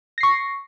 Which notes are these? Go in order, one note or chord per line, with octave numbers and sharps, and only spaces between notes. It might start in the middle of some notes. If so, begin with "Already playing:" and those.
C#6 A#6 C7